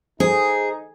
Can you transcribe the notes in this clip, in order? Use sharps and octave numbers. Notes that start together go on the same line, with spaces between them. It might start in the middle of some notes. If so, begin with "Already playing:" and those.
D#4 G#4 C5